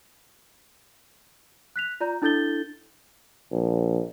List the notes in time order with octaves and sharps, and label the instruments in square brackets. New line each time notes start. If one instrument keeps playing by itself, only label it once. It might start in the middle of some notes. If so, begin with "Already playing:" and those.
[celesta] F#6 B6 F7
F4 D5 A#5 G6
D4 E4 A4 G6 A6 G7
[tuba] A#1